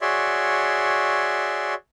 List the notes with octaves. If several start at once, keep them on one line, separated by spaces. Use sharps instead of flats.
F#4 G#4 C#5 D5 E5 C6